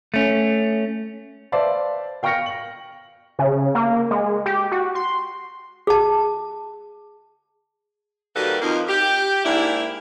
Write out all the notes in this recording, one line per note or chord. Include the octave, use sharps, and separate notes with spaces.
A3 C#4
B4 C5 D5 E5 F5 A5
F5 G5 C#6 F6 A#6 C#7
F#7
C#3
A#3
G#3
G4
F#4
C6
G#4 A5
D#3 F#3 G3 A#3 A4 B4
F2 A#3 D#4
G4
G#2 A#3 D4 E4